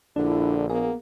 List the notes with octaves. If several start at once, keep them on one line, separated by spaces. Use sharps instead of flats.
A#1 D3 D4 E4
A#3 B3 G#4